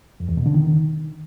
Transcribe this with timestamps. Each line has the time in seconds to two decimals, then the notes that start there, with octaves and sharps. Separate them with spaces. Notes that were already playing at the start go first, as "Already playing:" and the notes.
0.20 F2
0.29 E2
0.37 B2
0.46 D3
0.54 D#3